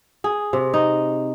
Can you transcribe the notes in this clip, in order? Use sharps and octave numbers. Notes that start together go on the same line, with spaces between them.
G#4
C3
D#4